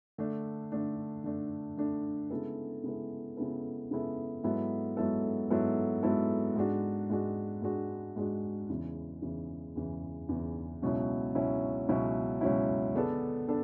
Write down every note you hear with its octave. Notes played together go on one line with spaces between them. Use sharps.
D3 A3 D4
D3 A3 D4
D3 A3 D4
D3 A3 D4
C#3 G#3 B3 E4 A4
C#3 G#3 B3 E4 A4
C#3 G#3 B3 E4 A4
C#3 G#3 B3 E4 A4
G#2 F#3 B3 E4 A4
G#2 F#3 B3 E4 A4
G#2 F#3 B3 E4 A4
G#2 F#3 B3 E4 A4
G#2 G#3 D4 F#4
G#2 G#3 D4 F#4
G#2 G#3 D4 F#4
G#2 G#3 D4 F#4
E2 C#3 E3
E2 C#3 E3
E2 C#3 E3
E2 C#3 E3
C#2 B2 F#3 C#4 E4
C#2 B2 F#3 C#4 E4
C#2 B2 F#3 C#4 E4
C#2 B2 F#3 C#4 E4
D3 G#3 B3 D4 A4
B3 D4 A4